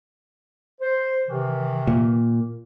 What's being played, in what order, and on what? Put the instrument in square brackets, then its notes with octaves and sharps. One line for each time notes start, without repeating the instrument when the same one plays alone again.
[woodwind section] C5
C3 D#3 E3
[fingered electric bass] A#2